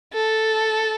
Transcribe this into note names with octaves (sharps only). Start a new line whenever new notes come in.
A4